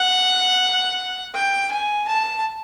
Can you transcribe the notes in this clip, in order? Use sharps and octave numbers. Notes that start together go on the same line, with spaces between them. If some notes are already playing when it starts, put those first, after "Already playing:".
Already playing: F#5
G5
G#5
A5